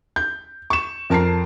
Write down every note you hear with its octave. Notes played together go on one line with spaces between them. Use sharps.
G6
C#6 E7
F2 A#4 A5 A#5 C7